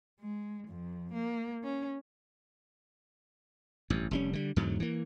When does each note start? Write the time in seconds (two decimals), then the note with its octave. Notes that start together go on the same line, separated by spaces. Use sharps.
0.21 G#3
0.68 F2
1.14 A#3
1.64 C#4
3.90 A1 G2
4.11 F1 G3 C#4
4.33 D3 G3
4.56 E2 G#2 D3 F#3
4.80 E3 A#3